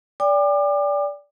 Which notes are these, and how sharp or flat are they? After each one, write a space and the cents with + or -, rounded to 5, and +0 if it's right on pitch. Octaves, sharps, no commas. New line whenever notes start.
D5 -20 G5 +35 D6 +35